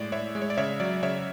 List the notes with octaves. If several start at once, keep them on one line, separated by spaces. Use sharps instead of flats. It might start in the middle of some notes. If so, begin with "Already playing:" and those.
Already playing: A2 G#3 D5
A2 C#5 E5
G#3
C#5
D5
C#3 C#5 E5
F#3 D5
C#3 C#5 E5